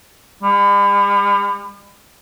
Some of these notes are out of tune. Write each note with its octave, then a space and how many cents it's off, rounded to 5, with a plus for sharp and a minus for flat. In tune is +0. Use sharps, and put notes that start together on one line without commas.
G3 +45